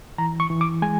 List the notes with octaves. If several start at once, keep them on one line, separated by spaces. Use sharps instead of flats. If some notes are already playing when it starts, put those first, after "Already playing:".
E3 A#5
C#6
E3
D6
G#3 G#5